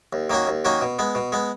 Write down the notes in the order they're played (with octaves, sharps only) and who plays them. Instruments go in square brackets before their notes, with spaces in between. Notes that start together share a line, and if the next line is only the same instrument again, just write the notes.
[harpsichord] D#2
D#3 A#3 C#4 F#4
D#2
D#3 A#3 C#4 F#4
B2
G#3 B3
B2
G#3 B3